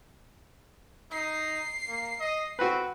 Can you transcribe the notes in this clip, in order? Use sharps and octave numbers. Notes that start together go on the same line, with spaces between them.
D#4 C7
A#3
D#5
C4 F#4 B4